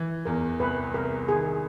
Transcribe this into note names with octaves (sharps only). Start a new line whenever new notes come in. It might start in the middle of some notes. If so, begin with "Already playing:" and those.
Already playing: E3
E2 A#4
C2 B4
C2 A#4
D#3 G#4